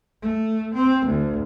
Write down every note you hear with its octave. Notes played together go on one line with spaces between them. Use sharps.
A3
C4
D2